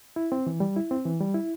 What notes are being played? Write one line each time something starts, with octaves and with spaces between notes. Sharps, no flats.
E4
C4
E3
G3
E4
C4
E3
G3
E4